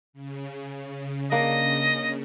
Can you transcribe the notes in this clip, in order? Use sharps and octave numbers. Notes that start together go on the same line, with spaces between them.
C#3
A#3 D4 D#5